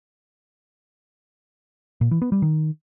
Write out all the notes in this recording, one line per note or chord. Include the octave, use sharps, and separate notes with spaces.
A#2
E3
B3
G3
D#3